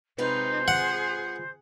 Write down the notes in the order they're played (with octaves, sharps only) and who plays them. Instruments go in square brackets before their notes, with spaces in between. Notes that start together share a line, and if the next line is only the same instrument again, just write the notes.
[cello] C3 D#4 [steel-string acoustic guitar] G#3 F4 B4 [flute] C5
[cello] G#4 [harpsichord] F#5